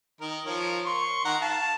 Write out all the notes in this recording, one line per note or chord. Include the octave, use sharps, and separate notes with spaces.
D#3 A#4
F3 A#4 C#5
C6 C#6
D#3 F#5 A#5
F5 A5